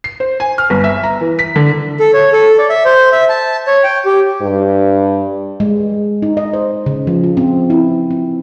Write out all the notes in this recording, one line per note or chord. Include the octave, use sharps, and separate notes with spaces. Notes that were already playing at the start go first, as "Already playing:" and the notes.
C7
C5
G#5
F6
G1
E5
A#5
E3
B6
D3
A4
C#5
A4
D5
E5
C5
E5
A5
C#5
G5
G4
G2
G#3
D#4
D#5
C5
C#3
F3
F4
C4
E4
C4